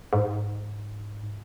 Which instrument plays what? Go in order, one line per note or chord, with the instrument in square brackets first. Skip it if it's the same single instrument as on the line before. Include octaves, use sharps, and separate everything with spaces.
[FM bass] G#2